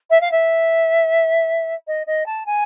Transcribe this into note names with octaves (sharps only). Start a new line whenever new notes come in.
E5
F5
E5
D#5
D#5
A5
G#5